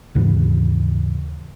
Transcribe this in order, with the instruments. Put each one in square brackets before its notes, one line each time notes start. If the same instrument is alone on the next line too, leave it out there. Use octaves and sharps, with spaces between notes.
[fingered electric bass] D#2 G#2 C#3 E3